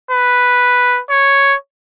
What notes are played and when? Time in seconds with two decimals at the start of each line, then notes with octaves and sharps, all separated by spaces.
0.11 B4
1.10 C#5